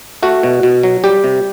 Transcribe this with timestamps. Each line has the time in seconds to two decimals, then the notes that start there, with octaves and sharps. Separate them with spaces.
0.23 A3 F#4
0.43 B2
0.63 B2
0.83 F#3
1.04 G3 G4
1.24 C3